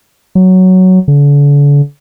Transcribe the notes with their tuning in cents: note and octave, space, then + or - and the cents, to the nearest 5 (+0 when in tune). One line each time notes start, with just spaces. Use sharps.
F#3 +5
D3 -40